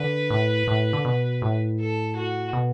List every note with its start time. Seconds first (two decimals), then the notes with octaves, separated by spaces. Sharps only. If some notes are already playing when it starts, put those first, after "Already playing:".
Already playing: D3 B4
0.30 A2
0.67 A2
0.93 D3
1.05 B2
1.42 A2
1.80 A4
2.16 F#4
2.53 B2